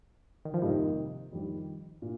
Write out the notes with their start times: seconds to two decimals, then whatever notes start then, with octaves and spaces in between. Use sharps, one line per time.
0.45 D#3
0.54 F3
0.62 F2 C3 D#3 G3 A#3 D#4
1.33 F2 D#3 G3
2.02 A#2